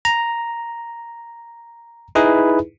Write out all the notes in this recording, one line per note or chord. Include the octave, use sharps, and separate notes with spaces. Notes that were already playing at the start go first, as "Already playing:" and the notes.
A#5
D#4 E4 G#4 B4